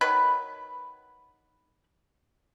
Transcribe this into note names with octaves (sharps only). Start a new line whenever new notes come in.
D#3 F#3 B4 B5